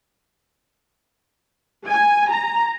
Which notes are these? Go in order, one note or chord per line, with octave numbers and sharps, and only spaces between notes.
G#5
A#5